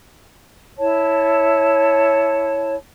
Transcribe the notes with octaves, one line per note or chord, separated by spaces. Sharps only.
E4 C#5 A5